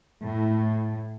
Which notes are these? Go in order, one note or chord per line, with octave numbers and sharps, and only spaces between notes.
A2